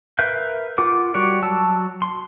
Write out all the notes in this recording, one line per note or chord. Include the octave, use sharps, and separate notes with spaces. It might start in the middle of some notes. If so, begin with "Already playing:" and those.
A#4 B4 E5 F5 G6
F4 A#4 F#5 D6
G3 F#4 C#5 D5
F#3 A5 E6
C6